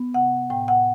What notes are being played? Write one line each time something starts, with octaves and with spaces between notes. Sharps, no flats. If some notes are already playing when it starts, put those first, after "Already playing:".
Already playing: B3
C3 F#5
A2 G5
F#5